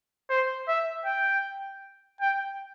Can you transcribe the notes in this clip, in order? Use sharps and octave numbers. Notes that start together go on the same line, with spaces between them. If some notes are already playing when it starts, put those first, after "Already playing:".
C5
E5
G5
G5